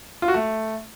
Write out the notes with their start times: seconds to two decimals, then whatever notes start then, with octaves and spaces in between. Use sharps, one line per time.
0.22 F4
0.28 F#4
0.34 A3